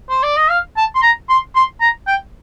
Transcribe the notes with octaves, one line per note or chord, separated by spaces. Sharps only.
C5
D5
D#5
F5
A5
C6
A#5
C6
C6
A#5
G5